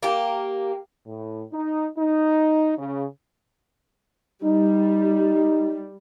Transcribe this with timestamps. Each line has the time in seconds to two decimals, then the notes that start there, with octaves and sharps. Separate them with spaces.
0.03 A#3 G4
1.06 A2
1.52 D#4
1.97 D#4
2.77 C#3
4.44 G3 D#4